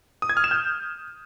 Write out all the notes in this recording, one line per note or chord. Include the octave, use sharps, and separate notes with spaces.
D#6
G#6
F6
E7
G6